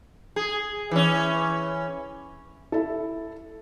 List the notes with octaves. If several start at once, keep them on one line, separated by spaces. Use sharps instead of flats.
G#4
E3 C#4
E4 A4